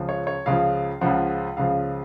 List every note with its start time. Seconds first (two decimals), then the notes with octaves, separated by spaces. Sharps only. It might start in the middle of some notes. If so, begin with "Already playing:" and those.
Already playing: C#2 C#3 F3
0.09 C#5
0.27 C#5
0.46 C#2 C#3 F3 F5
1.01 C#2 C#3 F3 F#5
1.57 C#2 C#3 F3 F5